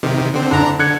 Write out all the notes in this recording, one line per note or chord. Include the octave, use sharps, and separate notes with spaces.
C3 D#3
D3 C4
F#1 D3 D4 A#5
D3 F#6 G#6 C#7